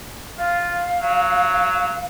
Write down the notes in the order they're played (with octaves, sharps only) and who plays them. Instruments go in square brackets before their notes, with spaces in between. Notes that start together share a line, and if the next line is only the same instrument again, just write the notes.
[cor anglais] F4 [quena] F5
[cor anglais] F#3